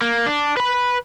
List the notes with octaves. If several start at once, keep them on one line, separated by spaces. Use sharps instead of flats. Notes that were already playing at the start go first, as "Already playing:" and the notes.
A#3
D4
B4 B5